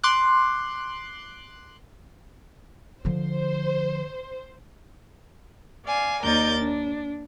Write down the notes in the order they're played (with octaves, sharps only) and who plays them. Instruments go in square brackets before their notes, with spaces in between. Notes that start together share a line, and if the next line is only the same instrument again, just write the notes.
[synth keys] C6 D6 F#6
[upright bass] D3 F3 [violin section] C5
[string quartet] D5 F5 G#5
D#2 D#4 A#4 D5 G6 A6
D4